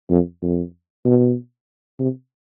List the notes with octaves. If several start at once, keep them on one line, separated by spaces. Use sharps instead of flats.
F2
F2
B2
C3